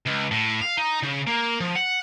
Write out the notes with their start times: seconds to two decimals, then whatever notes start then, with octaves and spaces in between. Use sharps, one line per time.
0.06 C#2
0.31 A2
0.61 F5
0.77 D#4
1.02 C#3
1.27 A#3
1.61 F3
1.75 F#5